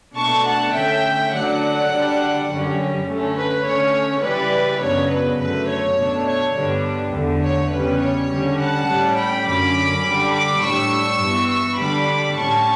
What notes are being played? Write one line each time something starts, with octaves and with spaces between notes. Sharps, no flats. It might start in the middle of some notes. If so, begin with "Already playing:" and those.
B2 A3 D4 A5 C#6
F#5 A5
D3 A3 C#4 E5 G5
D3 F#3 A3 D4 D5 F#5
D3 G3 D4
F#2 D3 G3 C#4
D3 A3 C#4
B4
D3 A3 C#4 C#5
C#3 E3 G3 B4 D5
F#2 C#3 F#3 B3 D4 C#5
B4
F#2 D3 A3 B4
C#5
B2 A3 D4
C#5
G2 D3 G3 B3 D4
E2 D3 A3
C#5
E2 C#3 G3 C#4 B4
C#5
D3 G3 C#4
F#5 A5
A2 G3 C#4
G5 B5
F#2 D3 F#3 C#4 B5 D6
D3 G3 D4
B5 D6
A2 G3 D4 C#6 E6
G2 E3 B3
C#6 E6
D3 G3 D4 B5 D6
A2 G3 C#4 A5 C#6